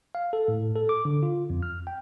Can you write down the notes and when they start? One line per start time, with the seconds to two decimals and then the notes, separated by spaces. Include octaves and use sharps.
0.15 F5
0.33 A4
0.48 A2
0.76 A4
0.89 D6
1.05 D3
1.23 F4
1.50 F2
1.63 F6
1.87 G5